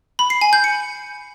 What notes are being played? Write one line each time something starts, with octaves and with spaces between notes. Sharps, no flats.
B5
C7
G#5
G6
C#7